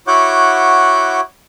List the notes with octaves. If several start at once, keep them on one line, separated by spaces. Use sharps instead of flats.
E4 F#4 C#5 F#5 D6 G6